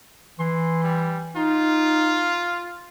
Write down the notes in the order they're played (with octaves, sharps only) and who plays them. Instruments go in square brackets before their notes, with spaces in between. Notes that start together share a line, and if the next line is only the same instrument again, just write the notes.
[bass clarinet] E3 [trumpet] C6
[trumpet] G3
[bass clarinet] D#4 [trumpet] F4